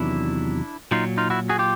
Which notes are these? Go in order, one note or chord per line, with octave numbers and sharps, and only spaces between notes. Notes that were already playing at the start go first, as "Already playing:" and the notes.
Already playing: E2 C3 D#3 F#3 D4 E4
A#2 F#3 D#4 F4
D#4 F4
E4 F#4
F#4 G#4
F4 G4